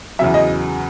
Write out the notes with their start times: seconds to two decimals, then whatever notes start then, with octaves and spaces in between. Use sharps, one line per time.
0.19 E2 C#3 F#3 E5
0.34 D#5